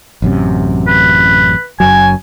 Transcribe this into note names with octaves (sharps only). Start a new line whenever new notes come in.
A1 F#2 C3
B4
F#1 F#2 F#3 G#5